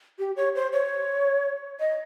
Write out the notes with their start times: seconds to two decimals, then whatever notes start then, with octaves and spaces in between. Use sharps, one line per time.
0.19 G4
0.36 C#5
0.55 C5
0.72 C#5
1.80 D#5